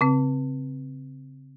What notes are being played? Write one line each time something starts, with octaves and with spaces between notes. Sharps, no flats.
C#3 C4